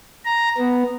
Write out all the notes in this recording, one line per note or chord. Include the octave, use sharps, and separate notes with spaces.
A#5
B3